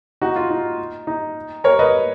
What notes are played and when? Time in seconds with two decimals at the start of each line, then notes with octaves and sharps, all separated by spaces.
0.22 D#4 F#4
0.36 F4
0.50 D#4
1.07 D#4
1.64 A#4 C#5
1.79 B4 D#5